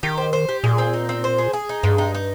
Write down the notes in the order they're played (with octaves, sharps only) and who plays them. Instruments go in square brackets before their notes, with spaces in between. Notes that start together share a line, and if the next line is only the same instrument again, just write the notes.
[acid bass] D#3 [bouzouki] G4
[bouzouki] C5
C5
G4
[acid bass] A#2 [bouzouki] G#4
[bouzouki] C4
D#4
C4
C5
G#4
G#4
D#4
[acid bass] G2 [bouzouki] G#3
[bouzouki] D#4
D#4